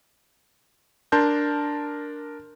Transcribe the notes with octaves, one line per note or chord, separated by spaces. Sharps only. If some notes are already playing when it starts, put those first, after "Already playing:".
D4 A#4 A5 C6 G6